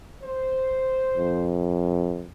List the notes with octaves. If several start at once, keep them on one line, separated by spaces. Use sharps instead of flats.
C5
F2